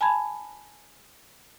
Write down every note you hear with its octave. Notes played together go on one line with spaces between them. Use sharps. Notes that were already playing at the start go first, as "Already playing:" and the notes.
G#5 A5 B5 G#6